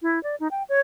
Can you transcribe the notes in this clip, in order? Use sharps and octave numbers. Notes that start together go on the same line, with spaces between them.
E4
D5
D#4
G5
C#5